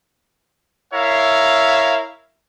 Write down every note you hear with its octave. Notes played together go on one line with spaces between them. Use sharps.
E4 A#4 C#5 E5 F5